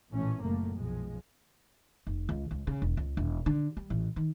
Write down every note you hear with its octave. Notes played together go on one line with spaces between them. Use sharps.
A1 A#2 E3 A3 C#4
F#1 F#2 A#2 A3 A#3
B1 F3 G#3
F1
C#2
C#2
C#3
E1
C#2
E1
D3
G3
A1
D#3